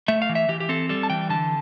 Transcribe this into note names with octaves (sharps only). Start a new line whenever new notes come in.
A3 E5
F5
E3
E5
E3 G4
G4
C4 A4
G3 A4
A5
E3 G5
D3 A5